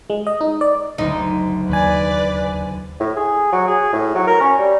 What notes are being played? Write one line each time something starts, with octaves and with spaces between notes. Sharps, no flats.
G#3
D#5
D#4
D5
F#1 D2 D#4
D#2 B4 D5 G#5
A2
G#4
F#3
G#4
A2
F#3
A#4
C#4
G3